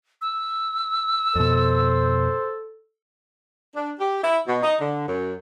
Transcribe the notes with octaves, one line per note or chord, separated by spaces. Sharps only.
E6
F2 B2 A4 C5
D4
G4
E4
B2
D#4
D3
F#2